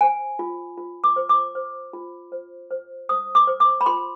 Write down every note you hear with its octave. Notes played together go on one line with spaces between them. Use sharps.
C5 G#5
F4
F4
D6
C5
D6
C5
F4
C5
C5
C5 D#6
D6
C5
D6
B5
F4 C6